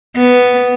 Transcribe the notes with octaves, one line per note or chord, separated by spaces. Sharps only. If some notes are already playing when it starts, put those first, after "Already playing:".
B3